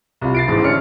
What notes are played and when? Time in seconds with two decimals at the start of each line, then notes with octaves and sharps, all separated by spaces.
0.21 C2 F4
0.34 A6 C7 D7
0.48 A1 G#2 E3 G#3
0.64 D3 C#4 F6 C#7